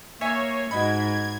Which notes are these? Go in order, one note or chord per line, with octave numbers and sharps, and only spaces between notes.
A#3 C#5 E5 G#5
G#2 F#4 D#5 B5 G#6